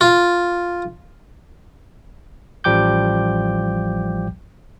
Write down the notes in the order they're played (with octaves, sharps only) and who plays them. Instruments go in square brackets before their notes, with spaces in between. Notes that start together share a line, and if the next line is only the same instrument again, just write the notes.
[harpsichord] F4
[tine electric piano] A1 F3 G3 G5 D6 G6